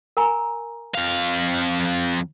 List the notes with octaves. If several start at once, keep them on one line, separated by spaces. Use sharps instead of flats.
A#4 G#5 A#5
F2 F5